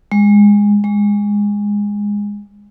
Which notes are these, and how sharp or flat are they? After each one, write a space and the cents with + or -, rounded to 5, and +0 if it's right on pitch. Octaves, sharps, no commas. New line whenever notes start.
G#3 -15
G#3 -15